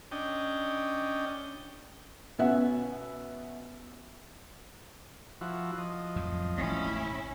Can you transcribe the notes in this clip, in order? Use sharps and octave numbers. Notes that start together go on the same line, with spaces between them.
C#4 D4 D#5 G5
B2 B3 C#4 E5 F#5
F3 E4 F#4
F3 D#5
F2 A2 F#3
E1 A1 C#4 E4